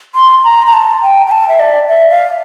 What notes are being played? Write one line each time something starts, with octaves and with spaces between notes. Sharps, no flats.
C6
A#5
A#5
A5
G5
G5
A5
E5
D5
E5
F5